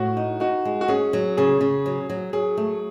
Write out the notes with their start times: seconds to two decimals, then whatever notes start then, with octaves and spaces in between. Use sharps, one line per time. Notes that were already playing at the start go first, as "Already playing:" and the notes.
Already playing: A2 F#4
0.17 D#4
0.40 D#4 F#4
0.65 G#3
0.81 F#4
0.88 C#4 G#4
1.13 F#3
1.37 C#3 G#4
1.61 C#3
1.86 F#3
2.10 F#3
2.33 F#3 G#4
2.57 A3